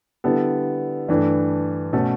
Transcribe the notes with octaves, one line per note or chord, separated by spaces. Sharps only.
D3 G3 B3 E4 A4
G2 E3 A3 D4
B2 A3 C#4 F#4 A4